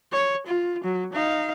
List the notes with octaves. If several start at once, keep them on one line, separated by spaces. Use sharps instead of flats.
C#5
F4
F#3
D#4 F5